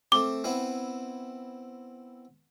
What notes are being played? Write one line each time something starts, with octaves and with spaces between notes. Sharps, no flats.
A3 C4 D6
B3 C4 E4